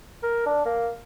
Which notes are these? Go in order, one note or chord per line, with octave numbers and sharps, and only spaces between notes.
A#4
D4
A#3